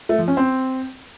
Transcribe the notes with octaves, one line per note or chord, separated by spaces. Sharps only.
A3
F3
C#4
C4